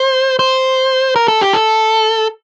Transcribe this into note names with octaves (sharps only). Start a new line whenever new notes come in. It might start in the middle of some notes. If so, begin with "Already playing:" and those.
Already playing: C5
C5
A#4
A4
G4
A4